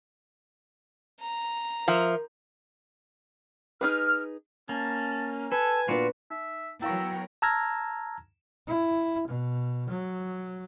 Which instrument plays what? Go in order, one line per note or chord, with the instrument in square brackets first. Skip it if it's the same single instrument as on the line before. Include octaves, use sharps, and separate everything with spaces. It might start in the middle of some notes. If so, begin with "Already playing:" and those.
[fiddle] A#5
[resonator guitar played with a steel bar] F3 [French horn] A#4 [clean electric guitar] E5
[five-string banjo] D#4 G#4 B4 [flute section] F6
[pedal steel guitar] A#3 [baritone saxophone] C#4 [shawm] A5
[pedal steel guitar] A4 [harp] B4 [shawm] G#5
[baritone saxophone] A#2 [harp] B3 D4 B4 [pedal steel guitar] F4 F#4
[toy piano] D#4 [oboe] E5
[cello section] F#3 B3 A#4 [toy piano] E4 F5 C#6 [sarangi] G5 [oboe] E6
[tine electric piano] A5 A#5 E6 F6 G#6 A#6
[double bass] E4
B2
F#3